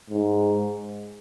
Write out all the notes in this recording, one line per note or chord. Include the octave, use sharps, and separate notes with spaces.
G#2